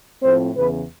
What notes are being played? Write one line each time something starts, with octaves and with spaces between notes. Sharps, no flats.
A2 F3 A3 C4 C5
E2 C#3 E3 B4